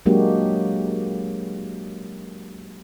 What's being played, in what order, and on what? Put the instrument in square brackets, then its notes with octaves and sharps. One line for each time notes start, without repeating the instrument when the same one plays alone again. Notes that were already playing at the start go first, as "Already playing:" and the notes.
[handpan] F#3 G#3 A#3 D4 F#4 G4